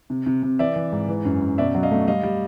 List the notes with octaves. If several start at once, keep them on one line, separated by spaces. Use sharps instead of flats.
C3
C3
C3
E3 D5 E5
E3
G#2
E3
F#2
F#2
B2 D5 E5
F#3
D#5 F5
A3
G3 D#5 F5
G3